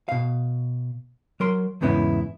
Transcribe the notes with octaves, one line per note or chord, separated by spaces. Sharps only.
B2 F5
F#3 A#4 C6
E2 G#2 C#3 B3 C#4 E4